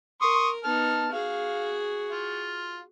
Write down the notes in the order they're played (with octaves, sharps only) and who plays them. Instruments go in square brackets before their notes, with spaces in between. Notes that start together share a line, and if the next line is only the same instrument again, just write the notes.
[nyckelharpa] A#4 [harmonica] C6 C#6 D#6
[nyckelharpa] B3 D#4 [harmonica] A5 F6
[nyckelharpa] F#4 G#4 [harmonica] F5
[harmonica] F4